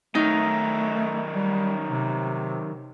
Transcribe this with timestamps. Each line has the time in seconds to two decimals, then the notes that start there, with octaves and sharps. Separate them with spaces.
0.15 D#3 F#3 A3 D#4
1.35 G3
1.89 C3